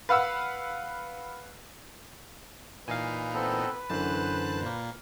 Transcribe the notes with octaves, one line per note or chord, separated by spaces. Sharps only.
B4 F5 F#5 E6
A#2 E3 D#4 B4 F5 G#5
B3 C4 A4
F#2 D3 E3 C5 A5 F#6
A#2 A#3